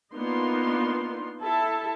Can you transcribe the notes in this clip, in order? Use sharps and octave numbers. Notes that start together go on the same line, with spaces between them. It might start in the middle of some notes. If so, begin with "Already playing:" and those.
A#3 B3 D4 D#4 F4 C6
E4 A4 E5 A5